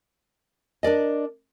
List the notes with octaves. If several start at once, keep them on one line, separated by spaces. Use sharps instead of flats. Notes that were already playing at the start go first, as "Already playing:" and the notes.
D4 A#4 D5 D#5